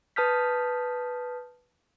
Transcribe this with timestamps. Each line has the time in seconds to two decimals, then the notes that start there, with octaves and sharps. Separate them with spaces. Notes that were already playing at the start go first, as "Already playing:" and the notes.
0.16 B4 A5 D#6 F6 G6 B6